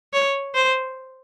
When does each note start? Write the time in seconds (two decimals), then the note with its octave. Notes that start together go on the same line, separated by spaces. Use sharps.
0.13 C#5
0.55 C5